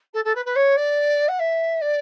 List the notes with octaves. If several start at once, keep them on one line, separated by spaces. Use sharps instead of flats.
A4
A4
B4
B4
C#5
D5
F#5
E5
D5